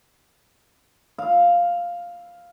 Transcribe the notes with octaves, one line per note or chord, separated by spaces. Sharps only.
F5